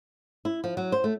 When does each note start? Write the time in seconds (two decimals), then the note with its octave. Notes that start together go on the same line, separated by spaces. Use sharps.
0.45 E4
0.64 F3
0.77 F#3
0.92 C5
1.04 A3